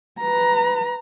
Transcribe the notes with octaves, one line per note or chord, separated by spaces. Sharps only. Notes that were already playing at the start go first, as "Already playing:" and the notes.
B4 A#5